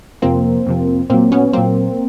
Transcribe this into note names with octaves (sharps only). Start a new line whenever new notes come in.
F2 C3 F3 A#3 C4
F2 C3 F3
A#2 F#3 A#3 C4
B3 C#4
A#2 F#3 A#3 C4